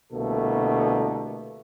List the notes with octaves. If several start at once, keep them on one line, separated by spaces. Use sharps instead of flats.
C2 B2 D3 A3 A#3 A4